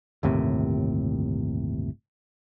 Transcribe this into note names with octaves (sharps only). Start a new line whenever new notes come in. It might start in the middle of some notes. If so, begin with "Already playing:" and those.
G1 D#2 A2 C3